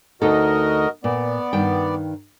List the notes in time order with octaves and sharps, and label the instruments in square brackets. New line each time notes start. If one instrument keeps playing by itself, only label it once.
[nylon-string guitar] D2 D#4 A4 [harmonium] F#4 A#4 D#5
[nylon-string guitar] A#2 [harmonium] B3 D5
[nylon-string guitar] G2 D#3 G5